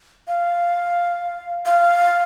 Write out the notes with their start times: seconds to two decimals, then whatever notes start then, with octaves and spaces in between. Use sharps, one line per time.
0.28 F5
1.65 F5